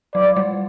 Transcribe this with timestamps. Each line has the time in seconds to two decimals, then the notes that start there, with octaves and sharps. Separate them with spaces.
0.14 F#3 D5
0.37 G3